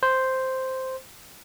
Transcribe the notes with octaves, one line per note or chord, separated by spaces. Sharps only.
C5